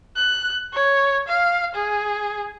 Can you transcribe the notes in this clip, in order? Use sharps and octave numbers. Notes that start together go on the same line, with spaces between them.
F#6
C#5
F5
G#4